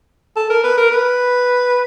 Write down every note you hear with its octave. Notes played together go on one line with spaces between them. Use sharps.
A4
A#4
B4
A#4
B4